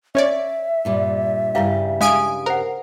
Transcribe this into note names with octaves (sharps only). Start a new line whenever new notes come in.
C#4 C#5 D5 E5
G2 A#2 G3
G2 C#3 E4 G4 B4 F5
G#3 D4 F5 G#5 D#6 D7
A#4 C5 F#5